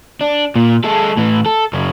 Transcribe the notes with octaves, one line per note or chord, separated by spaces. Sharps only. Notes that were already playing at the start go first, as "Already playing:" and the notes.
D4
A#2
G#3 A4
A2 E3
A4
F#2 C#3